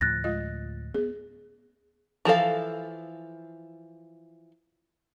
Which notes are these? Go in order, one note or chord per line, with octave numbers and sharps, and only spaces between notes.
D2 A2 F3 F#6 A6 A#6
G#3 F4 D#5
B3 C4 G#4
E3 F3 A4 F5